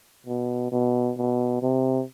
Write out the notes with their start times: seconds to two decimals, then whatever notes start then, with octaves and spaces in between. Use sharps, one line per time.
0.26 B2
0.72 B2
1.17 B2
1.63 C3